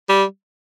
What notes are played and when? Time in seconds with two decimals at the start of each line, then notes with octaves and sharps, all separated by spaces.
0.09 G3